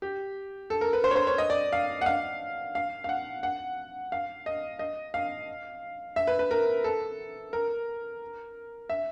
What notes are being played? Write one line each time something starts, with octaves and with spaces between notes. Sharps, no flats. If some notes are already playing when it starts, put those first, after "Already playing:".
G4
A4
A#4
B4
C5
C#5
C5
C#5
D#5
D5
F5
F#5
F5
F5
F5
F#5
F#5
F5
D#5
D#5
F5
E5
B4
B4
A#4
A4
A#4
E5